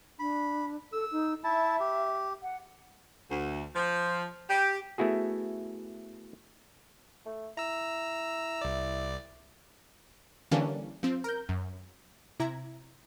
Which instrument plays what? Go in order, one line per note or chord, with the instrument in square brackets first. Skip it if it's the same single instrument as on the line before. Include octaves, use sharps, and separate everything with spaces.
[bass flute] D4 [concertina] B5
[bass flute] A4 [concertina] E6
[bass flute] D#4
[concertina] E4 A5 [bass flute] E5
[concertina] G4
[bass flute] F#5
[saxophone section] D2
F3
G4
[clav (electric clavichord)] A3 B3 E4 F#4 G#4
[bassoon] A3
[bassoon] E4 [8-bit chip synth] A#5 E6
[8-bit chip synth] C2 D5
[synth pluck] D3 E3 G3 A#3 C#4 D4
F3 C4
A#4 G6
F#2
C3 E4 A#5 G#6